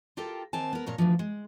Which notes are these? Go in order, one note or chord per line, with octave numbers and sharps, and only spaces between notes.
F4 G4 A4 A#4 G5
D#2 C4 A#4 G#5 A5
B3 A#4
A#2 A#4 C#5
D2 D3 E3 F3
G#3